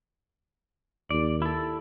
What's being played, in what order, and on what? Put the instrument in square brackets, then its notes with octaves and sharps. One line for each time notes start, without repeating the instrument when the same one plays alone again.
[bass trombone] D#2 [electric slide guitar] D5
[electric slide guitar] E4 A4